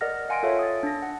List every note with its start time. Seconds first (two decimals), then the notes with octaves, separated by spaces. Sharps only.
0.01 A#4 D5 D#5 F#5 F6 A#6
0.29 F5 F#5 G#5 C6 A#6 D7
0.43 F4 A4 C#5 E5 F5
0.59 D#6 A6
0.83 D4 A#6
1.02 F#5